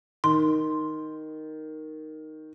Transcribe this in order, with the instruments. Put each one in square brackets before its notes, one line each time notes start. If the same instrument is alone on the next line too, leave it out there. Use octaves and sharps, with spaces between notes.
[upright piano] D#3 [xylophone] C6